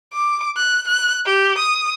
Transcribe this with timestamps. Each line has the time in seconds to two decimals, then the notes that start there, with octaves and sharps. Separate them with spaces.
0.13 D6
0.57 F#6
0.88 F#6
1.25 G4
1.58 D#6